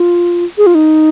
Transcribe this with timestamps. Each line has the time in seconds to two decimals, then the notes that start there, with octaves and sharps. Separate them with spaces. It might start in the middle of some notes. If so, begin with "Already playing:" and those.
Already playing: F4
0.58 G#4
0.67 F4
0.75 D#4